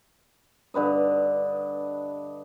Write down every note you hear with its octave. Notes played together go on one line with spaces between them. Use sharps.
G2 D3 B4 D#5